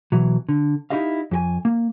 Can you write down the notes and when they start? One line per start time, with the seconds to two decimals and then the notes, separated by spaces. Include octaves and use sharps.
0.12 B2 E3 F#3
0.49 D3
0.90 D#4 E4 F#4 G4 D#5 F5
1.31 F2 G4 G#5
1.65 A#3